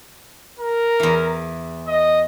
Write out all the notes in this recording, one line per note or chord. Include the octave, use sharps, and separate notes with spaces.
A#4
E2 E3
D#5